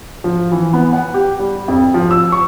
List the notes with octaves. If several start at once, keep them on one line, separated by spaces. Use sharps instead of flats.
F3
E3
B3
F#5
G4
G3
F2
F3
E6
C#6